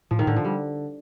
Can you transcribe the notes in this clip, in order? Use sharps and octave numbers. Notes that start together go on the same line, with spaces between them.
A2 F3
D#3
A2 D3
F3
G3